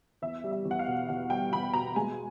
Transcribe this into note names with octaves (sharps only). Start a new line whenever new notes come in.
E2 E5
G3
E5
E2
F#5
F5
B2
E2 F#5
G3 G5
E2 B5
B2 A#5
G#3 G#5